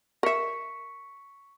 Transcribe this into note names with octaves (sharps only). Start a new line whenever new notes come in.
A#4 E5 C#6 B6 C#7